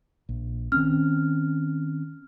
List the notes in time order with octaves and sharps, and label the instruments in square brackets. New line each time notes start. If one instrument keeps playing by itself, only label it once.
[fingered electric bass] A#1
[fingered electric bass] D#3 C4 C#4 [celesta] F6